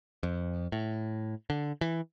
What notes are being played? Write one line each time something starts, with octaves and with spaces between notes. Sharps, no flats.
F2
A2
D3
E3